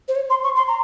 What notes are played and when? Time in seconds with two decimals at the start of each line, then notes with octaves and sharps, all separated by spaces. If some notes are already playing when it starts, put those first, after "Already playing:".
0.08 C5
0.15 C#5
0.30 C6
0.43 C#6
0.56 C6
0.67 A#5